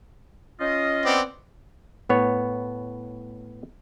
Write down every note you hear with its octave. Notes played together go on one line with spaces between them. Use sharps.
C#4 F4 D#5
B3 C4 D5
A2 B3 C#5